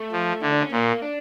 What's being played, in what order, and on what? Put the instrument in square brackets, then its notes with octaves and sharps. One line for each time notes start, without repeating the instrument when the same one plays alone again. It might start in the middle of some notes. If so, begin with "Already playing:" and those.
Already playing: [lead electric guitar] A3
[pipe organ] F3
[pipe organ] D3 [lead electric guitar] E4
[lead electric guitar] D4
C#4
[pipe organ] A#2 [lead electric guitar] A#3
[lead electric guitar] D4